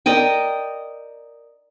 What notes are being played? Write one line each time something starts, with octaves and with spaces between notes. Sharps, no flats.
A#4 D5 D#5 G5